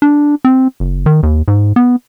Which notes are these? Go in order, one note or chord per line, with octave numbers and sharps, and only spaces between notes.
D4
C4
F#1
D#3
D#2
G#2
B3